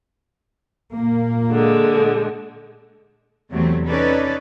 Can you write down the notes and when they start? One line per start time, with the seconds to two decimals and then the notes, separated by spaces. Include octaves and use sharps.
0.95 A#2 A#3
1.51 D3 G#3
3.51 E2 C3 F#3 A3 C4
3.88 C#4 D#4 A4 B4 D5